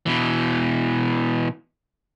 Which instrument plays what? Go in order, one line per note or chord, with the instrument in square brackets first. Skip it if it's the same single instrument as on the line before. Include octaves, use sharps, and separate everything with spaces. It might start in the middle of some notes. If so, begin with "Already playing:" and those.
[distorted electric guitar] B2 E3